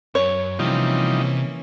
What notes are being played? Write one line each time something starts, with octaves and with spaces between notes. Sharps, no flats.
F#2 C#5
C3 E3 F3 G3 A#3 C#4 D#4